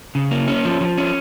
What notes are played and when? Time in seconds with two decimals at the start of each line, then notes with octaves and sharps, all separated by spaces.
0.15 C#3
0.31 A#3
0.48 C#4
0.65 F3
0.81 F3
0.98 C#4